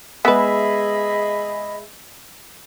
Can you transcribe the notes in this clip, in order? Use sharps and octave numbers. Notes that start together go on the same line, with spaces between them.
G#3 B3 G#4 B4 D#5 E5 B5